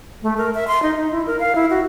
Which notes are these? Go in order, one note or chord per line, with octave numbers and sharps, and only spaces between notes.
A3
A#4
E5
C6
D#4
D#4
E4
A#4
F5
E4
F#4